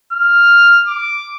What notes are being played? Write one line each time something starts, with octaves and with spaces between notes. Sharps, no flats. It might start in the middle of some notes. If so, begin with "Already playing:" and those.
F6
D6